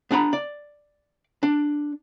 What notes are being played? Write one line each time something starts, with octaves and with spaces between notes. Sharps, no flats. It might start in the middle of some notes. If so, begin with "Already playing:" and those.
B3 D4 A#5 B5
D5
D4